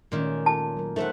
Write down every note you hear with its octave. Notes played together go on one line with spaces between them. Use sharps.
A#2 D#3 G#3 A3 C#4
F4 A4 A5
F#3 A#4
A3 D#4 A#4 C5 E5 F#5